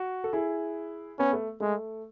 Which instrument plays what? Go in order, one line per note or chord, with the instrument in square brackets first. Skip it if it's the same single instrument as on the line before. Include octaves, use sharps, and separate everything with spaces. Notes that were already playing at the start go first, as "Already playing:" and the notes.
Already playing: [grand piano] F#4
A4
E4 G#4
[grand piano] B3 [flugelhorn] C#4
[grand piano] A3
[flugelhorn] G#3 [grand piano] A3